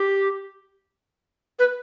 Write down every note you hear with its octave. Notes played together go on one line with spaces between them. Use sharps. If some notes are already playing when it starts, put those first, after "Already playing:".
Already playing: G4
B4